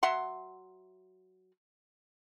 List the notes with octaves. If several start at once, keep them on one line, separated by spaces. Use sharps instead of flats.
F#3 E5 F#5 C6